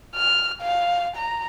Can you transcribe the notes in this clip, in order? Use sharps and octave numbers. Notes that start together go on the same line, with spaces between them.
F6
F5
A#5